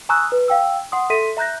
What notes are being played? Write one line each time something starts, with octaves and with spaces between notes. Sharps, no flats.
G#5 A#5 C#6 D#6 E6 F#6
B4
F5 G5 E6
F#5 C6 D#6
A4 E5 C6 B6 D#7
E5 A#5 F#6 G6 A#6